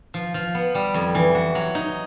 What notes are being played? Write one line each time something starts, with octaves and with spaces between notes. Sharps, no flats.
F3
F3
B3
G3
F2
E3
F#4
F#3
D#4